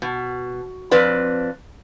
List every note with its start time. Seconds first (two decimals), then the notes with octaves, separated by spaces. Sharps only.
0.02 B2
0.91 F2 C4 B4 D5